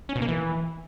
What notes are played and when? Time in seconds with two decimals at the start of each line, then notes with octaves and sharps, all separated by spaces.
0.09 C#4
0.15 B2
0.22 A#3
0.28 E3